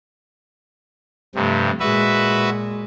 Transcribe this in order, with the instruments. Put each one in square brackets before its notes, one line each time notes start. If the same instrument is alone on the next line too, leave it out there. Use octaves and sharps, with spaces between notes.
[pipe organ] G2 C3 [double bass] F3 A3
[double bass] A#2 G#3 [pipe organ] F#4 B4 E5